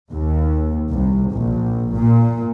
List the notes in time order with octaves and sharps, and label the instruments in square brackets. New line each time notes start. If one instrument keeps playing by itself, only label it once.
[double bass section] D#2
C2
A#1
A#2